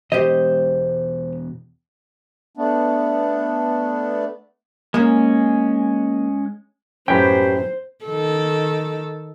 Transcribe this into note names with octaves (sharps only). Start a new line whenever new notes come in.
E2 B2 E3 G4 C5 D#5
A3 B3 D4
G#3 A#3 C#4
F#2 A2 C#4 G4 B4 C5 G5
D#3 A4